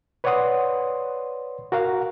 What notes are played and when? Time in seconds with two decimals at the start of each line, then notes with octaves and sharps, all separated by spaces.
0.24 B4 C#5 D5 F#5 C6 D#6
1.72 F#4 A#4 F5 F#5